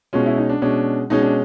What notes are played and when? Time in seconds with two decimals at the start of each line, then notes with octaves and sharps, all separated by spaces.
0.13 B2 G#3 C#4 F4
0.26 E4
0.38 D#4
0.49 D4
0.62 B2 G#3 C#4 D4
1.10 B2 G#3 C#4 D#4
1.23 D4